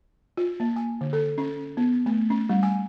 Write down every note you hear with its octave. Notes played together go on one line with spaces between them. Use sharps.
F4
A#3
G#5
D3
A4
C#4
B3
A3
C#4
G3
G#5